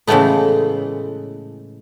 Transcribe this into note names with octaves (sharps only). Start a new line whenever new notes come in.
A2 C#3 E3 G#3 A3 B3